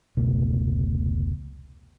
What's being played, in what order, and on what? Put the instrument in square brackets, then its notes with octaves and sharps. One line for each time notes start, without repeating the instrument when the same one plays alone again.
[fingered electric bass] F1 C#2 B2 A3